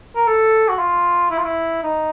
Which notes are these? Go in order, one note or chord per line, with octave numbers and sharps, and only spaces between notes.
A#4
A4
F#4
F4
E4
F4
E4
D#4